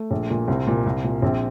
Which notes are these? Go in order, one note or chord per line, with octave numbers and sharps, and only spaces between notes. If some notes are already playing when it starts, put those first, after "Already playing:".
Already playing: A3
A#1
A#2
C2 C4
A#2
C2
A#2
A#1 C4